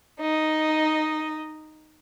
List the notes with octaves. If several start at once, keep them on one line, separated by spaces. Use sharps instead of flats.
D#4 D#5